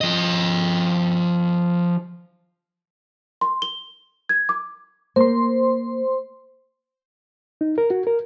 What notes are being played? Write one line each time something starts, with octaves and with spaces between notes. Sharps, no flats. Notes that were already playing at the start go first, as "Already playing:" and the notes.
F3 D#5
C6
G7
G#6
D6
A#3 C5 C6
D#4
A#4
F#4
A#4